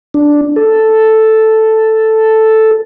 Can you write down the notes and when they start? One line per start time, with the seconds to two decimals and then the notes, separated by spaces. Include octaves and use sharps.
0.14 D4
0.56 A4